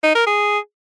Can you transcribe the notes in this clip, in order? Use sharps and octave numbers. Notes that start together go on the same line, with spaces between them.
D#4
A#4
G#4